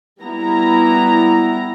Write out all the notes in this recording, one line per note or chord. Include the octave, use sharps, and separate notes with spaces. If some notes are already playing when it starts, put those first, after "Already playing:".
G3 B3 E4 A#5